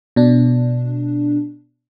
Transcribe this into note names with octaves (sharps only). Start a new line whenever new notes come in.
B2 D4